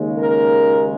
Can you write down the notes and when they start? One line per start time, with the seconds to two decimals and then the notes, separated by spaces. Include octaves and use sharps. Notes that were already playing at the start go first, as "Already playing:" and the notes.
Already playing: D#2 C#3 G#3
0.18 A#4